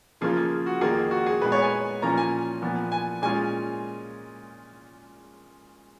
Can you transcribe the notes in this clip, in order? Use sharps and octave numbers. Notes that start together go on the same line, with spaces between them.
C#3 F3 A#3 F4 G#4
G#4
F#4
F2 D#3 A#3 F4 G#4
F#4
G#4
A#2 G#3 B3 D#4 B4
C#5
G#5
A#2 F3 A#3 C#4 F4 A#5
G#5
A#2 F3 B3
G#5
A#2 G#3 C#4 F4 G#5